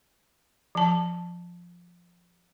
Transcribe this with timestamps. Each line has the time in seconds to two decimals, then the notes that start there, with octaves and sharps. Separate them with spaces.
0.75 F3 A5